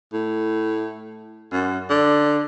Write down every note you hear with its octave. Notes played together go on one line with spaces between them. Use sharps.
A2
F#2
D3